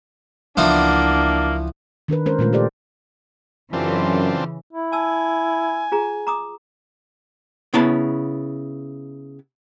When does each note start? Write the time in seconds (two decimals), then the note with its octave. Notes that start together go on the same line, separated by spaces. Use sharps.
0.57 C#2 E3 F3 A#3 B3 D4
2.08 D#3 D4 A#4 B4
2.26 G#3 C#4 A#4 C5
2.39 A#2 C#3 G#3 A3 F4 A#4
2.53 G4 A4 C5 D5
3.73 F#2 C#3 E3 C4 D4 F4
4.73 E4
4.93 G#5 A5 E6
5.92 F4 G#4 A#5
6.27 A#5 D6 D#6
7.74 C#3 B3 E4 C#5 A5